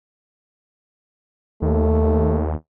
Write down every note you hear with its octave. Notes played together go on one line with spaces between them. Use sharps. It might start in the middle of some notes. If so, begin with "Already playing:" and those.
D#2 A3